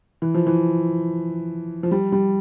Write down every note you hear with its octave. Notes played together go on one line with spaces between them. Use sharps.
E3
F3
E3
F3
G3
G3